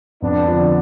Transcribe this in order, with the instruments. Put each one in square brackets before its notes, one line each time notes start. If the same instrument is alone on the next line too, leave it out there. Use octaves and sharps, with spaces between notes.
[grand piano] F2 [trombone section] B3 D4
[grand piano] D3 F3